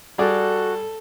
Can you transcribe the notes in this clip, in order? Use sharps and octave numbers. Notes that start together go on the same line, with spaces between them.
G3 F#4 G#4 A4 D5